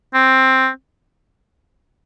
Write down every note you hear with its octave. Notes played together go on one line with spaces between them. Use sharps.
C4